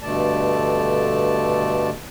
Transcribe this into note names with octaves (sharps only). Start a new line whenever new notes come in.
G2 B2 D3 A3 D5 A5